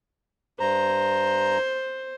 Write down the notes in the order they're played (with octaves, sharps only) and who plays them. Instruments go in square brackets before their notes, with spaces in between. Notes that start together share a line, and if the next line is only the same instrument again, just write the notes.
[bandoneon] G2 A#5 [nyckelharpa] C5